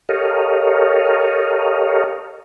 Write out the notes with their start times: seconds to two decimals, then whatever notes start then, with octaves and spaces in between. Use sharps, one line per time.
0.09 G4 A4 A#4 C#5 D#5 F5